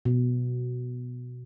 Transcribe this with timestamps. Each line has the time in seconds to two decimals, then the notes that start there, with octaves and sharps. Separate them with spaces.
0.05 B2